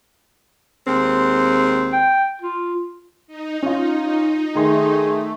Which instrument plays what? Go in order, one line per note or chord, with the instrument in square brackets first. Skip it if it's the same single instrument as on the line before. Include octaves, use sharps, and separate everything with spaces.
[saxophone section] D#2 G#3 C4
[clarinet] G5
F4
[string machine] D#4
[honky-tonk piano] C#4 F4
[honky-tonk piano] D#3 C6 [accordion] A3 [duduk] G#4